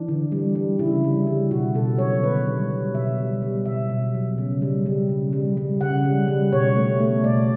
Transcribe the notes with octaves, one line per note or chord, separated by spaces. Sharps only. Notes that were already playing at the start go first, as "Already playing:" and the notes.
Already playing: E3 D4
D3
G3
G3
C#3 E4
G3
G3
B2 F#4
B2 A4
F#3 C#5
D3 B4
G3
G3
B2 E5
G3
G3
B2 E5
B2
F#3
C#3
G3
G3
C#3
G3
G3
C#3 F#5
G3
G3
B2 C#5
A3
A3
B2 D5